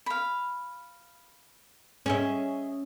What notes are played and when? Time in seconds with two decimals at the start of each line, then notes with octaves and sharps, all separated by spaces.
0.06 F5 B5
2.06 C#4 G#4 D#5 E5